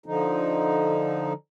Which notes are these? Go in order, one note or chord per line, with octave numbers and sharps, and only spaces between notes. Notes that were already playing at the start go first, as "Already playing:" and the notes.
D3 F3 D#4